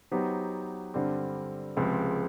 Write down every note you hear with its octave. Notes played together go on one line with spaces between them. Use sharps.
F#3 B3 D#4 G4 C5
G2 D3 G3 C4
C#2 C3 F3 G#3